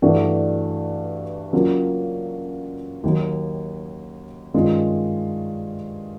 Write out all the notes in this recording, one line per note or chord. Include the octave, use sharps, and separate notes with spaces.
G2 E3 A3 D4 F#4
C#3 F#3 A#3 C#4 F4
D#2 D#3 F#3
G2 D#3 G#3 C#4 F4